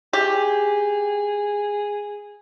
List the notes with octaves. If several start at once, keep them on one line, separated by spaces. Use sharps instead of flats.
G4 G#4